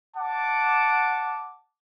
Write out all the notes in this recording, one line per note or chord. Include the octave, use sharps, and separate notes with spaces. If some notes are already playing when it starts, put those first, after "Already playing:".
F#5 A5 D6